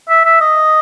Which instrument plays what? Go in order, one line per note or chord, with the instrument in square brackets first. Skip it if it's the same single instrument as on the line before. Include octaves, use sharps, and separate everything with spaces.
[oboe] E5
E5
D#5